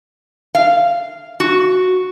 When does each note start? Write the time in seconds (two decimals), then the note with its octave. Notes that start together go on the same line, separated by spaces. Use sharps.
0.55 F5
1.40 F#4